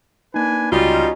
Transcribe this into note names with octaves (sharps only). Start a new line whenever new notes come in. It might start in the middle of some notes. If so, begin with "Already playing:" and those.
A#3 D4 D#4 B4 G#5
C#2 G3 C#4 D#4 F4 F#4 D#5